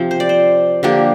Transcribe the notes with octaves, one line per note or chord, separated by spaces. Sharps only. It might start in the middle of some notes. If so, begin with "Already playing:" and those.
Already playing: C3 F3 C4
C5
D5
C5
D3 F3 A#3 D4 G4